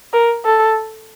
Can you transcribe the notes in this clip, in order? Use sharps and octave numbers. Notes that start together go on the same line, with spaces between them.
A#4
A4